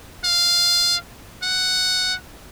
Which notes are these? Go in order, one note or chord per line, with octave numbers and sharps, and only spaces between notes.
F5
F#5